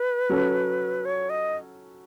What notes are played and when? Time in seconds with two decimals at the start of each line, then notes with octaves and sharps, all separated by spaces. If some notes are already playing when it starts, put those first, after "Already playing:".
Already playing: B4
0.30 F#3 C#4 F#4 A4
1.05 C#5
1.30 D#5